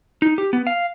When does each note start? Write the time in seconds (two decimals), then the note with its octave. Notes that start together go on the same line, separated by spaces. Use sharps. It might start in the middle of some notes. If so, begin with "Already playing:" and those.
0.22 D#4
0.38 G4
0.53 B3
0.67 F5